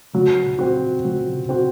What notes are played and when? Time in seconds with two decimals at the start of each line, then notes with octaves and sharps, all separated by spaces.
0.14 C#3 F#3
0.45 A#2
0.59 C4 F#4
1.04 A#2 F#3
1.28 C#3
1.35 C3
1.49 C4 F#4